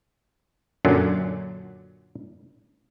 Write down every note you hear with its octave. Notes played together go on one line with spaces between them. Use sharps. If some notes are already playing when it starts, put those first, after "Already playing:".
F#2 A#2 D3 F#3